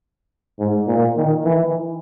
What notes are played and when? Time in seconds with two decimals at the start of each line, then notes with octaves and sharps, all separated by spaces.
0.59 G#2
0.88 A#2
1.17 D#3
1.44 E3